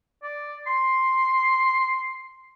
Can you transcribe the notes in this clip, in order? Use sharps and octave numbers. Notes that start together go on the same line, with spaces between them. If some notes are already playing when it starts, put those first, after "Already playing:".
D5
C6